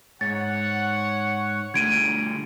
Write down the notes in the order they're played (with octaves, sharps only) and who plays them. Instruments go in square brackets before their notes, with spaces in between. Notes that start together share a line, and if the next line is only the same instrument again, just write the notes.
[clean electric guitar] G#2 [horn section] C#5 F#5 [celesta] A6
[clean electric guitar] D3 G3 A3 [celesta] G#6 D7 D#7